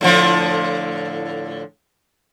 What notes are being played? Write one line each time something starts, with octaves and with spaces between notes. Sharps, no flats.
A2 D3 F3